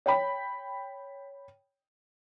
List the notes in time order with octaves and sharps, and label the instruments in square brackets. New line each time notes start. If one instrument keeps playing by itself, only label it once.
[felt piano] C#5 G5 B5